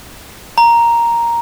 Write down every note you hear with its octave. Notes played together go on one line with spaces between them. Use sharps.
A#5